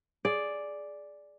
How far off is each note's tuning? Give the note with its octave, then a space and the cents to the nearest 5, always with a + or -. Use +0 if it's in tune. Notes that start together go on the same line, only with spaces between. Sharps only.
G#4 +10 D5 +0